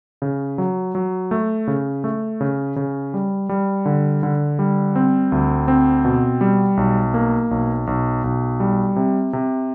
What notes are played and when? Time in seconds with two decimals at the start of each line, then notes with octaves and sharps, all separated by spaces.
0.22 C#3
0.58 F#3
0.95 F#3
1.31 A3
1.68 C#3
2.04 A3
2.41 C#3
2.76 C#3
3.14 G3
3.49 G3
3.86 D3
4.23 D3
4.59 G3
4.96 C4
5.32 D2
5.68 C4
6.05 B2
6.41 G3
6.77 B1
7.14 A#3
7.51 B1
7.87 B1
8.24 B1
8.60 G3
8.96 C3
9.33 C3